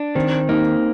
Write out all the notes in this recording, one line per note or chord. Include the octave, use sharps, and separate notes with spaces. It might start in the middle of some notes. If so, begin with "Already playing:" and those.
Already playing: D4
D#3 C4
A#3 D#4